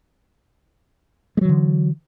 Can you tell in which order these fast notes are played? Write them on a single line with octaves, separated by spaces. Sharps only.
G#3 F#3 E3 D3